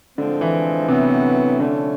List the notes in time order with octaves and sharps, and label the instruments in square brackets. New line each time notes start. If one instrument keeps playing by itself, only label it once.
[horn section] A2 F3 G#3 C4 [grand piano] D3
[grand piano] E3
[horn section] A2 F#3 B3 [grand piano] C3
[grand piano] D3 [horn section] F3 A3 C#4